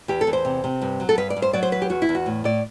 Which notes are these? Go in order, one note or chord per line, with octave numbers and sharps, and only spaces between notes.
E2 G4
A4
E2
C5
C3
C3
G2
F#3
A4
G2 B4
D5
G2
C5
F#3 D5
C5
E2 B4
G4
E2 F#4
E4
E2
F#4
A2
A2 D5